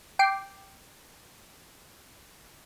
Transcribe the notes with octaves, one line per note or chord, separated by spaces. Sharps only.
G5 D6 C7